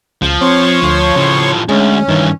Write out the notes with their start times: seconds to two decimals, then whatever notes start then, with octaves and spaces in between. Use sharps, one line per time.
0.22 C#2 F3
0.41 C4 C#5 C6 C#6
0.82 D2
1.16 A2 C#3 F3
1.69 D2 G#3 C#4
2.09 G2 D#3 E3